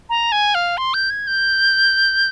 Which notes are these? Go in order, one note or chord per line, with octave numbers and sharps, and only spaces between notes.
A#5
G#5
F5
C6
G6
G#6
G6